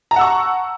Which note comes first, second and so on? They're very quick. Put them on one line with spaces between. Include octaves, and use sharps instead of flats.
A#5 A5 F#5 E6 C#6